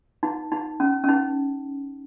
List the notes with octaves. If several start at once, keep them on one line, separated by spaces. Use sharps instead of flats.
D#4
D#4
C#4
C#4
D#4